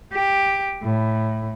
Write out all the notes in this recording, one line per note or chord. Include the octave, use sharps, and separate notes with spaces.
G4
A2